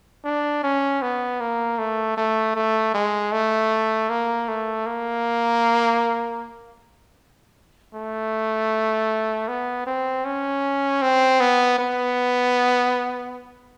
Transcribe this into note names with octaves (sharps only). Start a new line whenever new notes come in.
D4
C#4
B3
A#3
A3
A3
A3
G#3
A3
A#3
A3
A#3
A3
B3
C4
C#4
C4
B3
B3